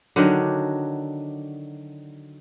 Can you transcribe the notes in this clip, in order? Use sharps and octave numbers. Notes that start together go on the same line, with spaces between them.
D3 D#3 F#3 D4